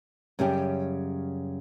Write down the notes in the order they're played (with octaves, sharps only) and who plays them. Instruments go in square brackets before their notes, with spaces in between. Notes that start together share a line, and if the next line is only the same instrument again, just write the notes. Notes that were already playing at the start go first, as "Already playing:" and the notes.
[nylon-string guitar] F#2 C#3 G3 G4 G#5